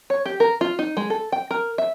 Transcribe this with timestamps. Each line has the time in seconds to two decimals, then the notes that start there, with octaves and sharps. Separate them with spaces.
0.10 C#5
0.26 G4
0.40 A#4
0.61 F4
0.79 D#4
0.97 G#3
1.10 A4
1.32 G5
1.51 A#4
1.78 E5